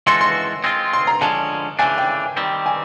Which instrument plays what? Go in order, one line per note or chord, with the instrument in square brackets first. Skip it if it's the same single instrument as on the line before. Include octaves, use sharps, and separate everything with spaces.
[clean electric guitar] E3 G#3 C#4 F#4 A4 [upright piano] C6
[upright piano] C6
[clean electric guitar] G#3 C4 F4
[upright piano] C6
A#5
[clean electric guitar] D3 F3 G#3 C#4 [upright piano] A5
[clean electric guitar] C#3 E3 A3 D4 [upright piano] G#5
[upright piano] G5
[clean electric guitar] D#3 G3 C4
[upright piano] G#5